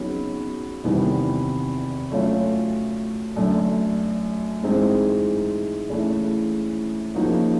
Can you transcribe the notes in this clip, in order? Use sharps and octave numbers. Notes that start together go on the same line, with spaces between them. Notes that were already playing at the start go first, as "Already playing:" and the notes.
Already playing: C#3 F#3 B3 D#4
E2 C3 D#3 G3 B3
F#3 A3 C#4 F4
F#2 D3 F#3 A3 D4
G#2 E3 G#3 C4 D#4
C#3 E3 A3
C#3 F3 A#3 D#4 F#4